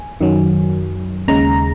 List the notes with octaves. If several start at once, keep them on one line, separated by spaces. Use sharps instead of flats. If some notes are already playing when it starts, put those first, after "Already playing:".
Already playing: G#5
F#2 D#3 F#3
D#2 C#3 G#3 A#5